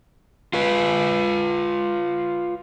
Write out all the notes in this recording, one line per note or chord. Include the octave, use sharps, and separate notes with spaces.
F4 B4